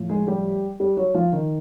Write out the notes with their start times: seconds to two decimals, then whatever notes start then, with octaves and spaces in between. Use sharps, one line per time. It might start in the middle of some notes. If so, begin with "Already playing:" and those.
Already playing: A2 F3
0.09 G#3 G#4
0.27 G3 G4
0.80 G3 G4
0.97 F#3 F#4
1.14 F3 F4
1.33 D#3 D#4